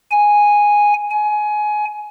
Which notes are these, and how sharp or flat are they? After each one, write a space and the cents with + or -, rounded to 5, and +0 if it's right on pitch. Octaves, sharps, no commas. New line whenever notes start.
G#5 -5
G#5 +20